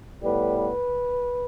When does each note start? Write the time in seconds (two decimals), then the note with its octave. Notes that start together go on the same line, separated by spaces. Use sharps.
0.22 A2 G3 B3 B4
0.57 B4